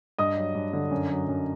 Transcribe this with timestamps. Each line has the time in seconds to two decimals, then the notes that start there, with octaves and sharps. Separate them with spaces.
0.18 G2 D#5 D#6
0.37 F#3
0.55 G2
0.73 D3
0.91 F#2
1.10 F#3
1.28 F#2